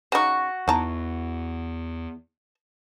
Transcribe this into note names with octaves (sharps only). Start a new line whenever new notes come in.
C#3 D#4 F#4 C#6
E2 E3 D#4 A5 A#5